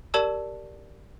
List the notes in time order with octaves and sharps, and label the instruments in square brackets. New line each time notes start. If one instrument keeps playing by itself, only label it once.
[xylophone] G4 A#4 D5 A5 E6